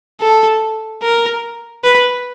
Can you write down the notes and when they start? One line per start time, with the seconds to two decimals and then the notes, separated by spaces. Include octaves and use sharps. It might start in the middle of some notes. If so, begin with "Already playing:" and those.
0.21 A4
1.03 A#4
1.84 B4